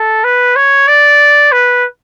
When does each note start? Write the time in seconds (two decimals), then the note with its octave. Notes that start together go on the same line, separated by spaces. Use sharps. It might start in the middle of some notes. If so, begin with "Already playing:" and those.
Already playing: A4
0.24 B4
0.56 C#5
0.88 D5
1.52 B4